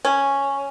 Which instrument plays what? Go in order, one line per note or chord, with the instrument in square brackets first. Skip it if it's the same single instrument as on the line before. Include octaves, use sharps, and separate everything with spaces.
[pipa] C#4